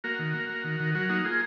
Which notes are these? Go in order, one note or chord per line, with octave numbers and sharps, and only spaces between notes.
A#3 F#4 A#4
D#3
A#3
A#3
D#3
D#3
F#3 F#4 A#4
A#3 D#4 F#4
A#3 F4 G#4